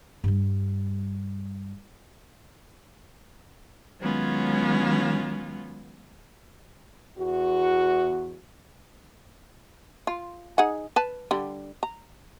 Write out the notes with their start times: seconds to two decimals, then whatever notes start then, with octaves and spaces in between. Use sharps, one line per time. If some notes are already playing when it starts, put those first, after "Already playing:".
0.24 G2 G3
3.99 D#3 F#3 G#3 B3 C#4 F4
7.18 E2 F#4
10.07 F4
10.58 D#4 G#4 F#5
10.96 B4 A5
11.31 D3 G3
11.83 A#5